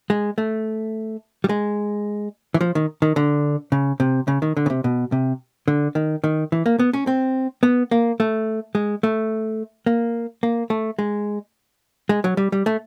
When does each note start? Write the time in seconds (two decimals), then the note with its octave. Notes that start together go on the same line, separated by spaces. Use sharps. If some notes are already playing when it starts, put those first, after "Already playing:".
0.10 G#3
0.38 A3
1.44 G3
1.49 G#3
2.54 E3
2.61 F3
2.75 D#3
3.02 D#3
3.16 D3
3.72 C#3
4.00 C3
4.28 C#3
4.42 D#3
4.57 D3
4.66 C#3
4.70 C3
4.84 B2
5.12 C3
5.68 D3
5.95 D#3
6.24 D#3
6.52 E3
6.66 A#3
6.79 B3
6.93 C#4
7.07 C4
7.63 B3
7.91 A#3
8.20 A3
8.75 G#3
9.03 A3
9.86 A#3
10.43 A#3
10.70 A3
10.99 G#3
12.09 G#3
12.24 F#3
12.37 G3
12.52 G3
12.66 A3